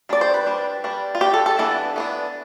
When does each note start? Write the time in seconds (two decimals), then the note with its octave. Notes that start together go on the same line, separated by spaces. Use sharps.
0.09 G3 D4 D5
0.21 C5
0.34 B4
0.46 G3 D4
0.84 G3 D4
1.15 F4
1.21 G3 D4 G4
1.34 A4
1.46 A4
1.59 E3 B3 D4 A4
1.96 E3 B3 D4